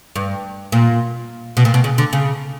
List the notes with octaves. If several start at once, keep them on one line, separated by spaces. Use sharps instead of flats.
G2
A#2
B2
A#2
B2
C#3
D3
C#3